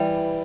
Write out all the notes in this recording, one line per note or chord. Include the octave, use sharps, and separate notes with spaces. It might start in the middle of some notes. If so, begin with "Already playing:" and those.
Already playing: E3 G3